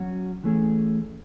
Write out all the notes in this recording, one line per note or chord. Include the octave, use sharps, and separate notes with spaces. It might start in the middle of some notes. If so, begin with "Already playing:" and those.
Already playing: F#3 C#4 F#4
E3 A3 C#4 G#4